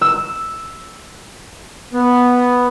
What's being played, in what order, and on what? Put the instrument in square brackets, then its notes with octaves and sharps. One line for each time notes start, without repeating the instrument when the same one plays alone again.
[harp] E6
[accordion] B3